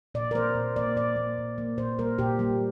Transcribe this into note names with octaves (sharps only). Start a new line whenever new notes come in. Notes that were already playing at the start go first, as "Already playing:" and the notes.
A#2 D5
A#4
A#3 C5
A#2
A#3 D5
A#2 D5
A#3
A#2
A#3
A#2 C5
G3 A#3 A#4
A#2 G4
G3 A#3